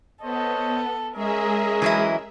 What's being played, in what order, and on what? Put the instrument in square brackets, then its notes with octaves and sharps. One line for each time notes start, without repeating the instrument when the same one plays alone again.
[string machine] B3 [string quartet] A4 [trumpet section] C5 C#5 D#5
[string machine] G#3 G#4 E5 [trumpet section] C#4 D#5 [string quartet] A#4
[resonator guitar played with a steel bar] E3 F#3 E4